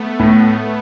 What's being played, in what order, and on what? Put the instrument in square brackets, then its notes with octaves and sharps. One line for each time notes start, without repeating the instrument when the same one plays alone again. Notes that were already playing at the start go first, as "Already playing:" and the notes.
Already playing: [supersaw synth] A3 B3
[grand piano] A2